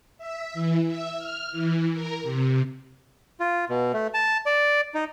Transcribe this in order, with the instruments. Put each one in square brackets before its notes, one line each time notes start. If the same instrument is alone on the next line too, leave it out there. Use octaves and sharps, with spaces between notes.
[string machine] E5
E3
E5
F6
E3
A#4
C3
[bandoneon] F4
B2
A3
A5
D5
D#4